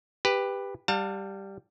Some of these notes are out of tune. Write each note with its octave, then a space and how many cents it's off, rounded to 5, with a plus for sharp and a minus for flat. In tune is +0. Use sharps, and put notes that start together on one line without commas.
G4 +15 B4 +0
G3 +0 F5 +40 A5 +35